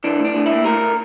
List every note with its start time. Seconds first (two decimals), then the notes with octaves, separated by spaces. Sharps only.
0.04 E3 D4
0.20 A2
0.25 D4
0.35 A2
0.46 E4
0.51 A#3
0.66 A2 A#4
0.81 A2